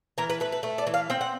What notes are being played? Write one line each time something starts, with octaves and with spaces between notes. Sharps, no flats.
E3 A#4
B4
A3 B4
B4
A3
D5
E3
F5
C4 G5
F#5